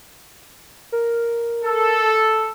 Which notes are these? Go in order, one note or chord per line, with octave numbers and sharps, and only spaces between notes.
A#4
A4